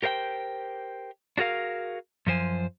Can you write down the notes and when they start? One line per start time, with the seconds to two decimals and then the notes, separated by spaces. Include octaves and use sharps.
0.03 G4 A#4 C5 F5 G5
1.38 D4 F#4 G#4 A#4 F5
2.27 F#2 F3 C5 G#5